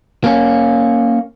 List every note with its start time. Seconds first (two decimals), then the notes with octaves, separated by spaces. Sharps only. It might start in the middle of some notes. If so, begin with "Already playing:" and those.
0.24 A#3 C#4